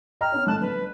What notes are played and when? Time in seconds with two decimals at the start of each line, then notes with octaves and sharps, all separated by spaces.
0.21 D#5 G5 A#5 F6
0.32 B3 C#4 C#5
0.47 G#1 A2 A5 F#6
0.61 G1 B4